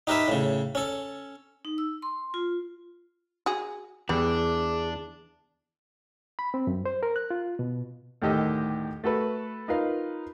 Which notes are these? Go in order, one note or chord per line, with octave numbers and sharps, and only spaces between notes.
D#4 G4 A#4 B4 E5
A2 C#3
C#4 A4
D#4
E6
C6
F4
F#4 G#4
E2 E3 G3 D4 G#4
B5
C4
F#2
C5
A#4
F#6
F4
B2
D2 A2 D#3 G4 D#5 E6
A3 F#4 A4 B4
D#4 F4 A#4 B4 F5